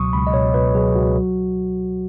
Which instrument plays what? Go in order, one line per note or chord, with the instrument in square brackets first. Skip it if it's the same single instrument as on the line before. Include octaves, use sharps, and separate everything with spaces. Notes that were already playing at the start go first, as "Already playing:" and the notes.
Already playing: [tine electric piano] C#2 B2 F#3 C#6 D#6
C#2 B5
D#5
B2 C#5
B2 B4
F#3 G#4
C#2 F#4
F#3